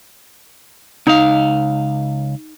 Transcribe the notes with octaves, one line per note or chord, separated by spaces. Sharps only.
C#2 D#4 F5